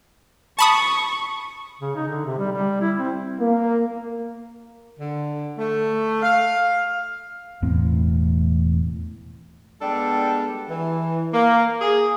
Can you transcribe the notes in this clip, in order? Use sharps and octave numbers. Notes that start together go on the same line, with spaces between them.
A5 B5 C#6 D#6
C#3
D#4
D3
C3
G3
G3
E4
C4
A#3
D3
A3
F5
E1 E2 A2 C4
G3 G#3 B3 D4 G4 A4
E3
A#3
G#4